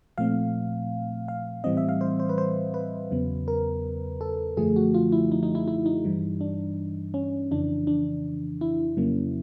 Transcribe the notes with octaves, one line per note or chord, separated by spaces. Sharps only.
A#2 F3 A3 C4 F5
F5
A2 E3 G3 C4 D#5
E5
F5
C5
C5
B4
C5
B4
E2 C#3 F#3 B3
A#4
A4
F#2 D3 F3 A3 G#4
F#4
F4
E4
D#4
D#4
E4
E4
D#4
G2 E3 G3
D4
C#4
F2 C#3 E3 D4
D4
E4
F2 C#3 F#3 A#3 C#4